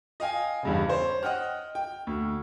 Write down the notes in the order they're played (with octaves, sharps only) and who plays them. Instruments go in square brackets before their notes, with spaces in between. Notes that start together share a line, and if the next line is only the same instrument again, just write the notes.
[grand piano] D#5 F5 G5 G#5
E2 G2 C#3
C5 C#5
D#5 F#5 G5 F6
G5
D2